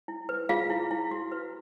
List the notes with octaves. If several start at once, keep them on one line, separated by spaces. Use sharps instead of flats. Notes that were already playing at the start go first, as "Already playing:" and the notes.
E4
B4
F4 G#4 F5
E4
E4
F#4
B4